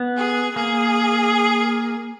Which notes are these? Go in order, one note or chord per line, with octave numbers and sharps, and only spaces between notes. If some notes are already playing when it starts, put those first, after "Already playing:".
Already playing: B3
G#4
A#3 G#4